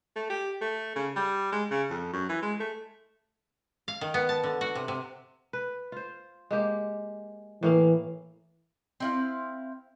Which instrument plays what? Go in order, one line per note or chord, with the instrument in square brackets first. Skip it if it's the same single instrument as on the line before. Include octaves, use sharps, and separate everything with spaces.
[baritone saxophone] A3
G4
A3
C#3
G3
G#3
C#3
F2
F#2
E3
G#3
A3
[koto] F5
D#3
B3
A5
D3
F#4
C3
C3
[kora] B4
F4 C5
G#3 A#3 G4
[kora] A2 A#3 F5 [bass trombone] E3
[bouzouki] C4 E4 F5